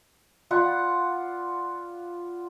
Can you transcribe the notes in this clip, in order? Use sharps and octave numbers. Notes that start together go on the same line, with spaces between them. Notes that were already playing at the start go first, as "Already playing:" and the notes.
F4 D5 F#5 B5